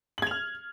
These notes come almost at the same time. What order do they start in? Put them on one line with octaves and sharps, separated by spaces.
F#7 G#6 F7 F6